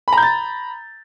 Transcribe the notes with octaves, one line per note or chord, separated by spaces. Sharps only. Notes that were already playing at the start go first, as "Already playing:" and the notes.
A#5 B5 G6 A6